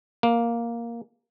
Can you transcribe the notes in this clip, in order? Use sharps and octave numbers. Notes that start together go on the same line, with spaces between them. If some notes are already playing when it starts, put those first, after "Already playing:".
A#3